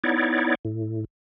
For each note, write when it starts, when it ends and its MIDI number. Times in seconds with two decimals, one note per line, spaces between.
0.04 0.55 59
0.04 0.55 63
0.04 0.55 64
0.04 0.55 73
0.04 0.55 74
0.65 1.05 45